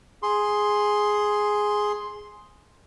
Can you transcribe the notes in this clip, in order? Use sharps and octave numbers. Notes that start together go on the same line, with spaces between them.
G#4 C6